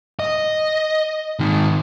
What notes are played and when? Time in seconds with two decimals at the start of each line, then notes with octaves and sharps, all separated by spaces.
0.20 D#5
1.40 G#2 D#3